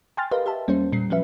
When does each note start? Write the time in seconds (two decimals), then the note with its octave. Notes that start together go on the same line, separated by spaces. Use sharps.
0.17 G5 G#5 C6 F6 A6
0.31 G4 A#4 B4 D#5 F5 C6
0.46 G4 E5 A5
0.67 E2 G3 A#3 C#4 C5
0.92 A#2 G3 C7
1.10 F3 F#3 C#4 B4 E5